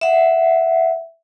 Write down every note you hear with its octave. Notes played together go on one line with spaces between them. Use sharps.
E5 F#5